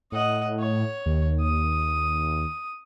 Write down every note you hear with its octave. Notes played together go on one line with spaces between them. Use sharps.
A2 D#5 F#5
C#5
D#2
D#6